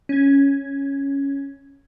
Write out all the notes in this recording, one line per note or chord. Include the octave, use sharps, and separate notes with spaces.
C#4 G#6